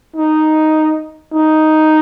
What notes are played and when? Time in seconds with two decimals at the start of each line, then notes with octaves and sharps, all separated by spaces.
0.16 D#4
1.34 D#4